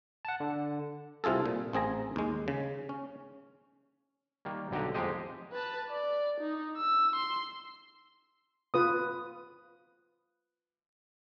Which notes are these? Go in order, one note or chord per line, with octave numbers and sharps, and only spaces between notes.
F#5 A5
D3
C2 C3 F4 G#4 A4
A#2
A1 C4 G#4 A#5
D#2 G#3
C#3
C#4
D#3 G3 A#3
B1 D3 G4 F#5 A#5
F2 G#3 G4 C5 D#5
B4 A5
D5
D#4
E6
C6
F4 B4 D#6